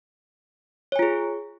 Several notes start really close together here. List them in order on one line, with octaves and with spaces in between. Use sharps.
C#5 G#5 F4 G#4